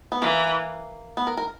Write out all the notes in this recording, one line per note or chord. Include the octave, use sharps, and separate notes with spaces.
B3
E3 A#3
B3
A#4
A#4